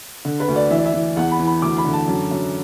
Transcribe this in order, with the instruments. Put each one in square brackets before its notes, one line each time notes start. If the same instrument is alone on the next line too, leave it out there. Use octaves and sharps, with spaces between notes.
[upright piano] D3
B4
D2
D5
E3 E5
D5
E5
E3
E2 F#5
B5
E3
B5
D2 D6
B5
D3
A5
F#2
F#2